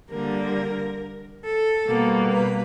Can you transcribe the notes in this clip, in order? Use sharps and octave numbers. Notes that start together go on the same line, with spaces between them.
D3 G3 A#3 A#4
A4
B2 G3 A#3
B4